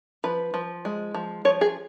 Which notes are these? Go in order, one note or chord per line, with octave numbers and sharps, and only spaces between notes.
F3 B4
F3
G#3
F3
F3 C#5
G#4